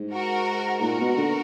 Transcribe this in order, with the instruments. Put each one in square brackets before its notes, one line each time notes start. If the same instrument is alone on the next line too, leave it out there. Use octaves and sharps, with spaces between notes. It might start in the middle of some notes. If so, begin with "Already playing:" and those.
Already playing: [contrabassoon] G#2
[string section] F#4 A#4
[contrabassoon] A#2 [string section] F#4 A#4
[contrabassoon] B2
D3